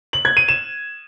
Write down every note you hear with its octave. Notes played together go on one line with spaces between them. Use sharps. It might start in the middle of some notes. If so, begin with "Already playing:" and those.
F#7
G#6
D#7
E7